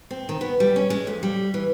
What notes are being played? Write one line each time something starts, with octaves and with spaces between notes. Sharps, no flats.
C4
D#3
B3
G3
C#4
G#3
F2
G3
E3